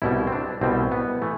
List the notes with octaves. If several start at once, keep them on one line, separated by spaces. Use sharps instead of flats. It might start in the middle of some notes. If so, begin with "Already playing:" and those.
C2 B2 G3 E4
C4
D4
C2 B2 G3 C4
B3
E3 A3